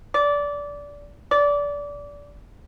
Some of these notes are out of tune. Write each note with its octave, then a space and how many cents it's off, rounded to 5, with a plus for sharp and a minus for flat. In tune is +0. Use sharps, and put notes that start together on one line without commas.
D5 -20
D5 -25